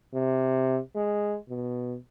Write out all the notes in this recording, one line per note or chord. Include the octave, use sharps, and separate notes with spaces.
C3
G#3
B2